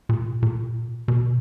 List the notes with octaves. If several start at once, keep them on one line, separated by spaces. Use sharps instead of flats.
A#2
A#2
B2